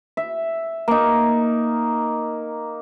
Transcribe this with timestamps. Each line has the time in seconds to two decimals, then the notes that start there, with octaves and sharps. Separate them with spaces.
0.17 E5
0.88 A#3 D#4